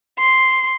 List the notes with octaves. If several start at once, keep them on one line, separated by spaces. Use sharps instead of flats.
C6